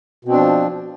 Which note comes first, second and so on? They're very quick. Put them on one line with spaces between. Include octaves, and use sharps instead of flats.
B2 C4 D4 F3